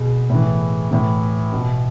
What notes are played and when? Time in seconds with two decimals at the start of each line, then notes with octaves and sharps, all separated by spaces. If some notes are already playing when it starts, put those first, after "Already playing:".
Already playing: B2 G#4
0.30 A2 E3
0.91 A2 E3
1.53 B2